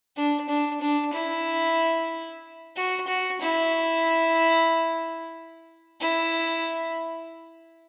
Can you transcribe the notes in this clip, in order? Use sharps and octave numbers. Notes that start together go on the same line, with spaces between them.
D4
D4
D4
E4
F#4
F#4
E4
E4